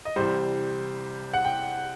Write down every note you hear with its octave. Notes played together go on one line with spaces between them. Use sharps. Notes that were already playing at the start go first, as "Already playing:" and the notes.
D#5
C2 C3 E3 G3 C5
F#5
G5